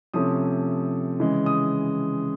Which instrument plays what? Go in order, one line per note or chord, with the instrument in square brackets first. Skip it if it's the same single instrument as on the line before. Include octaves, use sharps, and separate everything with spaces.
[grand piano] C3 F3 A3 C#4 D#6
C#3 E3 G#3
D#6